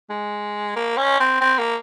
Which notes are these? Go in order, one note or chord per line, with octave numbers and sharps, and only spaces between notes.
G#3
A#3
C#4
C4
C4
A#3